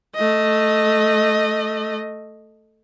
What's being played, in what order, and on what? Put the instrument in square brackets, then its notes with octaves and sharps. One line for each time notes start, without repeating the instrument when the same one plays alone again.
[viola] A3 D#5